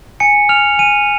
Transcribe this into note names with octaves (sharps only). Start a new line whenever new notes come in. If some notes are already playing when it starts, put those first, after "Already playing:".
G#5 C#7
F6 F7
G#5 D#7